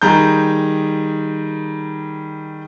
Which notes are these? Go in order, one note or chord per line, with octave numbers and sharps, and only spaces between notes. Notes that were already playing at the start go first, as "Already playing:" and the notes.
D#3 G3 G#4 A#5 G6